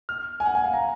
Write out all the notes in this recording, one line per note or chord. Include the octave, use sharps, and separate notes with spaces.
F6
G#5
F#5
G#5
F5
A#5